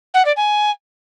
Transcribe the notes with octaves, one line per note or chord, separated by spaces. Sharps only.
F#5
D5
G#5